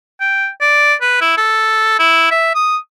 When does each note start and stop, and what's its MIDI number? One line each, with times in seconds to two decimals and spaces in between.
0.21 0.49 79
0.61 0.94 74
1.01 1.21 71
1.21 1.33 64
1.37 1.95 69
1.99 2.30 64
2.31 2.54 76
2.55 2.77 87